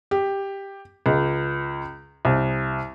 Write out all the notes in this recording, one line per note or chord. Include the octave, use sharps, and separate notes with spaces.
G4
C#2
C2